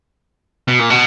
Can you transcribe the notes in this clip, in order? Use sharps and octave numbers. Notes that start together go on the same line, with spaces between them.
B2
A#2
B2